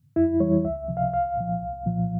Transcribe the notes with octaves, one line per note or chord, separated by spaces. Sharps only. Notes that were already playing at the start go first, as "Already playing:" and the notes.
F2 E4
E3 G3 C#5
C#2 E5
C3 F3
F5
C2 F5
A#2 F3
C2
A#2 F3